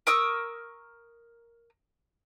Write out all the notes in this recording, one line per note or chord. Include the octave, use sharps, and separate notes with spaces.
A#4 C#6 D#6 E6